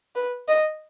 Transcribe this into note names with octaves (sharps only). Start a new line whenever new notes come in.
B4
D#5